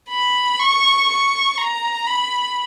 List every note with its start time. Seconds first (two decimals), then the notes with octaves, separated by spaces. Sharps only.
0.09 B5
0.59 C#6
1.09 C#6
1.58 A#5
2.07 B5